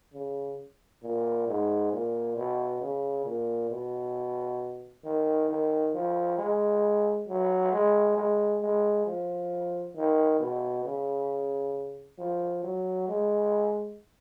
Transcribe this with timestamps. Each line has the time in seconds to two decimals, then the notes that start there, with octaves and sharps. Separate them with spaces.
0.14 C#3
1.03 A#2
1.48 G#2
1.93 A#2
2.37 B2
2.81 C#3
3.26 A#2
3.71 B2
5.04 D#3
5.49 D#3
5.94 F3
6.38 G#3
7.28 F#3
7.73 G#3
8.17 G#3
8.62 G#3
9.06 F3
9.96 D#3
10.40 B2
10.85 C#3
12.19 F3
12.63 F#3
13.08 G#3